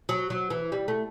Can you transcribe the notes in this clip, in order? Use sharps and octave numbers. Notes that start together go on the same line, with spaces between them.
F#3
F#3
E3
G3
A3